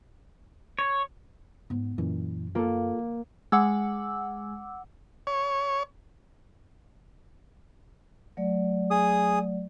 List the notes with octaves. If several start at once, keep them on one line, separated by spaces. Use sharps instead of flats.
C#5
G#2 B3
F#2 A#2 E3
A#3 F4 A4
G#3 F#5 D6 E6
C#5
F#3 A3 D5
G#4 D#6